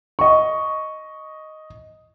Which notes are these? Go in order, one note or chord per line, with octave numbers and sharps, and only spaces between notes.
D#5 C#6